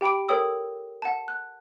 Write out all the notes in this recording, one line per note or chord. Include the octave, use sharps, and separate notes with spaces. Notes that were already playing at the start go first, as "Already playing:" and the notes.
G4 G5 B5 D6 D7
A4 A#4 C#5 G5 D#6 E6
F#5 A5
F#6